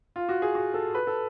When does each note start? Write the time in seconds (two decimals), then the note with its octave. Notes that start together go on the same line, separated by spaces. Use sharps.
0.16 F4
0.29 F#4
0.42 G#4
0.55 F#4
0.74 A4
0.95 B4
1.07 A4